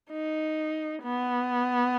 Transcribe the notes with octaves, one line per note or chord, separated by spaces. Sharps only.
D#4
B3